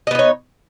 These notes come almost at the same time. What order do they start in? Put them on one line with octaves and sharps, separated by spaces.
D#5 B3 D#4 C#5